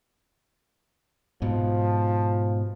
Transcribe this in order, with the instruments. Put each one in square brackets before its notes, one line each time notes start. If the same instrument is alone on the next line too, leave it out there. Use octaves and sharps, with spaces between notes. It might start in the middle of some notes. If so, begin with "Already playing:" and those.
[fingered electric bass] G#2 B2 [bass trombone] F3